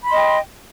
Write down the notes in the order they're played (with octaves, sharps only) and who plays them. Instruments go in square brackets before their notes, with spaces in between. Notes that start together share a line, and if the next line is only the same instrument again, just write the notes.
[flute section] B5
C6
D#5
G5